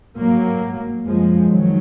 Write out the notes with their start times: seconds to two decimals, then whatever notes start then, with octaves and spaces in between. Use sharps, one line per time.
0.18 G#2 F#3 A#3
0.62 G#2
1.06 F#2 C#3 F3 G#3
1.50 F2 D#3 F#3